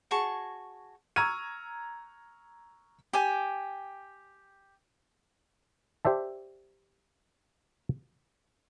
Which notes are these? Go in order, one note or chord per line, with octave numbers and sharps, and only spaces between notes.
F#4 G#4 A5 C#6
A#5 C#6 E6 F6 G#6 D#7
G4 G5 G#5
G4 C5 D5 E5 A5